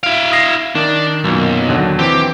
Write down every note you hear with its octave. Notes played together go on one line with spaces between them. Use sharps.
E4 F5 D7
D#6 A#6 C7
D#3 D4
B1 F#2 A#2
D#2 D3 F#3
E3 C4 G4